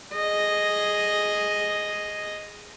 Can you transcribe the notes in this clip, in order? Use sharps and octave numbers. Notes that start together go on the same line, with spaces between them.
G#4 D#5